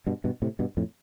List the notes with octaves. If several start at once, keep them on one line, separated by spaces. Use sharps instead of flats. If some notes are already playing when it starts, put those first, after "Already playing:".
G2 B2
G2 B2
A2 C3
G2 B2
F2 A2